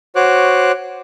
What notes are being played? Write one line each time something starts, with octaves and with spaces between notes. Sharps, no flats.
F#4 C5 C#5 D6 F#6